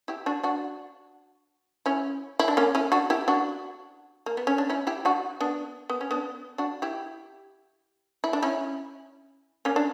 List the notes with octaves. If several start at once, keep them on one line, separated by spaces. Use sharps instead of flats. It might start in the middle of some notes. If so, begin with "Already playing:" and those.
E4 G4
D4 F#4
D4 F#4
C#4 E4
E4
D4
A#3 C#4
C#4 E4
D4 F#4
E4 G4
D4 F#4
A#3
B3
C#4
D4
C#4 E4
E4 G4
D4 F#4
B3 D4
B3
C#4
B3 D4
D4 F#4
E4 G4
E4
D4
C#4 E4
A#3 C#4
D4